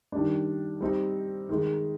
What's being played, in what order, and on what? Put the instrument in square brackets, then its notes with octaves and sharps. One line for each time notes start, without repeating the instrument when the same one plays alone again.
[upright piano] D#3 G3 D4
G3 C4 D#4
D#3 G#3 D#4